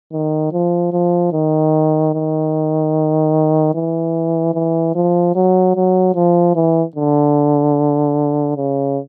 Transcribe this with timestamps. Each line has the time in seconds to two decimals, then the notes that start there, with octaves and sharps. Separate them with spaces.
0.13 D#3
0.53 F3
0.93 F3
1.33 D#3
2.14 D#3
3.75 E3
4.54 E3
4.96 F3
5.36 F#3
5.76 F#3
6.15 F3
6.56 E3
6.96 D3
8.57 C#3